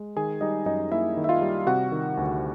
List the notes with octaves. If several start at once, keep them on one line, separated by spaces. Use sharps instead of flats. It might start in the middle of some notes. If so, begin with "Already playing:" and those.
Already playing: G#3
D#3 G#4 G#5
G3 D#4 D#5
F#2 D#4 D#5
A#3 E4 E5
D#3
E5
F4 F5
G3
C3 F#4 F#5
D#3
D2